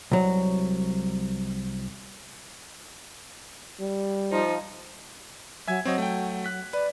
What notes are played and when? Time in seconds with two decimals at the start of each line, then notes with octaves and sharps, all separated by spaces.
0.12 C2 F#3
3.80 G3
4.32 F3 D#4
5.68 F#3 E5 G#5 G#6
5.85 F#3 C4 C#5 D#5
5.98 A3 G5
6.44 F#6 B6
6.73 B4 D5